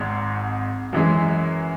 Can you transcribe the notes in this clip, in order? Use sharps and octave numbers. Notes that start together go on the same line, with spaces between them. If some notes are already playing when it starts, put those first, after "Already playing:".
Already playing: G#1 G#2 G#3
F#2 E3 G#3